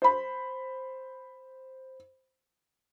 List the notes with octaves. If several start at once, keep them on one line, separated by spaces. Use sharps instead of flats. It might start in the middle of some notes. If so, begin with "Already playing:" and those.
C5 B5